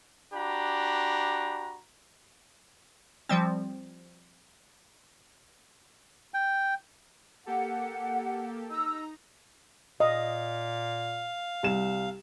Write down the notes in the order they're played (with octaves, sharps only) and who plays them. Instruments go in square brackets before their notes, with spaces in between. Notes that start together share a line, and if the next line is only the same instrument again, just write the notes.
[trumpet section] D4 F#4 G4 A#5 B5
[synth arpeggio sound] F3 G3 C4
[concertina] G5
[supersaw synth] A#3 G4 A4 [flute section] F#5
[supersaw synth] D#4 A#5 [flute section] E6
[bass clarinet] A#2 [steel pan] D#5 [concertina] F5
[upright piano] C2 E7